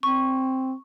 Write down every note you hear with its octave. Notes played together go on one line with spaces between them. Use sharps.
C4 C#6